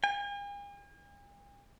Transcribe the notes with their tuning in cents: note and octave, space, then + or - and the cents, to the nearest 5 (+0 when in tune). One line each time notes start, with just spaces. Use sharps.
G#5 -45